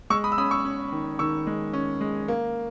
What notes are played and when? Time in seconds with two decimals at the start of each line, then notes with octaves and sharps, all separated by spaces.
0.10 G#3 C#6 E6
0.24 B5 D#6
0.32 E6
0.38 C#4 B5 D#6
0.51 C#6 E6
0.65 C#4
0.92 D#3
1.19 D#3 C#6 E6
1.47 G#3
1.73 C#4
2.01 G#3
2.28 A#3